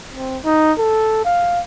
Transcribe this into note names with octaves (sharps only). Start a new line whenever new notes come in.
C4
D#4
A4
F5